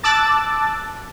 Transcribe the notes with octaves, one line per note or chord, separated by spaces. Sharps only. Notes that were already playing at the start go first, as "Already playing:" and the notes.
A5 D6 E6 F#6 A6